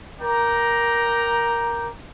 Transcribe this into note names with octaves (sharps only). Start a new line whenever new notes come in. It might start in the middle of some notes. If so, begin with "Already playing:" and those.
A#4 D5 G5 A#5